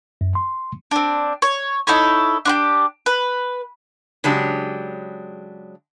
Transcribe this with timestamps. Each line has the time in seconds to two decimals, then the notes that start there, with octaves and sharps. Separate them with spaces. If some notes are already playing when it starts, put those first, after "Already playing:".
0.21 F#2
0.35 C6
0.91 C4 D4
1.42 C#5
1.87 D#4 E4 A4 C#5
2.45 D4 F4 G4
3.06 B4
4.24 C#3 F#3 G#3 D4 G4